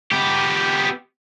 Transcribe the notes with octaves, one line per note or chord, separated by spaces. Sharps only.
B3 G4